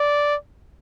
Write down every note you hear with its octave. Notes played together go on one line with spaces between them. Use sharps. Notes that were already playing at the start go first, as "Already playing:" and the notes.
Already playing: D5